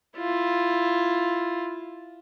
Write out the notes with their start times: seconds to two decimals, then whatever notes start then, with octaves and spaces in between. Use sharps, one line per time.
0.17 E4 F4